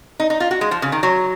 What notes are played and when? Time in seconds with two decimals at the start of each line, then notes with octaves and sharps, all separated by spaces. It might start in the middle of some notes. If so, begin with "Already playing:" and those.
0.20 D#4
0.30 D#4
0.40 F4
0.51 F#4
0.61 G#3
0.71 F3
0.82 C#3
0.92 D#3
1.03 F#3